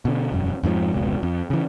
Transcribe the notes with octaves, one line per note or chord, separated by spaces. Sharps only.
B2 D3
E1 F#2
F2 G#2 C#3 F3
F1 C#2 B2
F2
C#3 E3